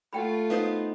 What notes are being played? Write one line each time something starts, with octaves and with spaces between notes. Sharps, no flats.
A3 F4 F#5 G5 B5
B3 D#4 C5 F5 D#6